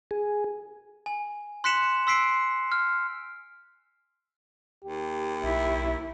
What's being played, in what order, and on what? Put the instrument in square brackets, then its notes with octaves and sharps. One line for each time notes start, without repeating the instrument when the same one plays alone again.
[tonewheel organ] G#4
[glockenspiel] G#5
C6 F#6 B6 C#7 E7 F#7
C6 E6 B6 C7 D7
F6
[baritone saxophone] D#2 [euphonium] G4
[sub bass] B1 [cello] E4